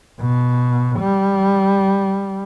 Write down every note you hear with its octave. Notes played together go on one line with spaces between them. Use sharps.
B2
G3